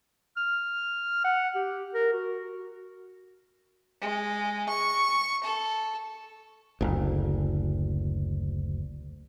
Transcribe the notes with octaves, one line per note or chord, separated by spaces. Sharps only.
F6
F#5
G4
A#4
F#4
G#3
C#6
A4
F#1 D2